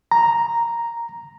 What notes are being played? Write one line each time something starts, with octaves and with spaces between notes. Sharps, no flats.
A#5